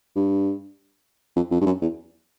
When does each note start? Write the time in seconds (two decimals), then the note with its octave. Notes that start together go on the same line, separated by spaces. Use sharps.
0.16 G2
1.36 F2
1.51 F2
1.61 G2
1.66 F#2
1.82 E2